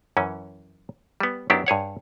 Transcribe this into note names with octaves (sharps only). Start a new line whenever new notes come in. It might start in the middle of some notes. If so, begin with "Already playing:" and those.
F#2 E3 C#4
G3 B3
F#2 F#3 B3 D4 E4 G4
G2 G#4 C#5 F#5